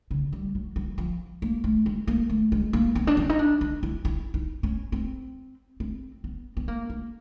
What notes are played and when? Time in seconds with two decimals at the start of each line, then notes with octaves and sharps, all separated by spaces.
0.11 C#3
0.32 G3
0.55 F#3
0.76 F#3
0.98 F3
1.42 A#3
1.64 A3
1.86 G#3
2.07 A#3
2.29 A3
2.52 G#3
2.73 A#3
2.95 B3
3.07 D4
3.17 C#4
3.29 D#4
3.39 D4
3.61 D#4
3.83 E4
4.05 E4
4.34 D#4
4.63 C#4
4.92 C4
5.80 C4
6.24 B3
6.57 B3
6.68 A#3
6.90 A#3